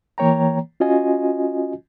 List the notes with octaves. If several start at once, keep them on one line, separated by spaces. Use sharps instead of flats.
E3 A#3 C#5 G5 A#5
C#4 F4 F#4 D#5 G#5